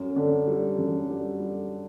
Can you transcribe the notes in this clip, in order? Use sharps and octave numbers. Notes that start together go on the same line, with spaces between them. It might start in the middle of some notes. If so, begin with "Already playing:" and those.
Already playing: F#2
D3
G3
F#2
G3
G3